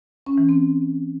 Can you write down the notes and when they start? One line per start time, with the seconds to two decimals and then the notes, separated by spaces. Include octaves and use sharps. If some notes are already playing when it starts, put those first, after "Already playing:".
0.26 C#4
0.38 E3
0.49 C4